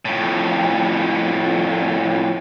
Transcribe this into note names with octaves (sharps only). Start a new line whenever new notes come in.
F2 A2